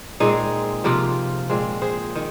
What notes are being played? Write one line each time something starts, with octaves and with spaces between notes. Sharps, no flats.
A#2 G#3 C4 D#4 G#4
C3 F3 A#3 F4 A#4
A#2 G#3 C4
G#4 C5
D#3